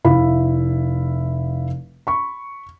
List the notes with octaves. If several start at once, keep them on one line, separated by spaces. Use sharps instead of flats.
F1 E4 E5 F5 B5
B5 C#6